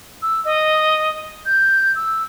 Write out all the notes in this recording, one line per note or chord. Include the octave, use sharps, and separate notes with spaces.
E6
D#5
G6
E6